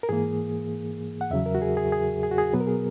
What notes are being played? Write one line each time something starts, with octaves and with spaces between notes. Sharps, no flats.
A#4
G#2 E3 A#3 G#4
F#5
E2 C#3 F#3 E5
A#4
F#4
G#4
G#4
G#4
G#4
F#4
G#4
B2 F#3 B3 B4
A#4
G#4